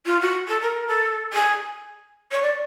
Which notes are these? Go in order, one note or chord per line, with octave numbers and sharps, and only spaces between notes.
F4
F#4
A4
A#4
A4
G#4
C#5
D5